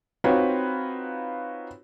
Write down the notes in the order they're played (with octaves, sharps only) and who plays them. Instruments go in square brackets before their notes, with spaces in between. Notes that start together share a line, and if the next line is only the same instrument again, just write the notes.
[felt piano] C4 D#4 F4 F#4 B4 C#5